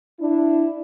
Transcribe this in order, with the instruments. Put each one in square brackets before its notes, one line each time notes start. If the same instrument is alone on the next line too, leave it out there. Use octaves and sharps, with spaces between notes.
[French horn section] D4 E4